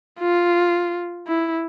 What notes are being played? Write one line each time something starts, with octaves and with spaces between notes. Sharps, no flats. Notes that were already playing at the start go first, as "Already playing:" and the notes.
F4
E4